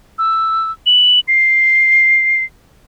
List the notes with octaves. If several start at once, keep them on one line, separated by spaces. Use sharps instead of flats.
E6
F#7
C7